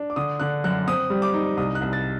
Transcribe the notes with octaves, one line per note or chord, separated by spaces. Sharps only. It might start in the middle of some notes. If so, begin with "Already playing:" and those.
Already playing: D4
D6
D3 D#6
D3 F#6
F#2 F#6
C4 D#6
G3
D6
D#4
C2 D#6
F#6
C2
A6